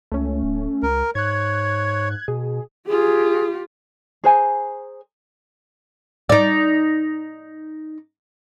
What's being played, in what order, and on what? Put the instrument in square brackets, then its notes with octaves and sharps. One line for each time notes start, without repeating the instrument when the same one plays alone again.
[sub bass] C#2 [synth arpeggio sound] A3 C#4
[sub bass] D1
[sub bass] C#2 [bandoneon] A#4
[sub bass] G#2 [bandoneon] C#5 [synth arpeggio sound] F#6 G#6
[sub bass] B2 [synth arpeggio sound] G#4
[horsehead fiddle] F4 G4 [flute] G#4
[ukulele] G#4 C5 G#5 A#5
[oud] D#4 D5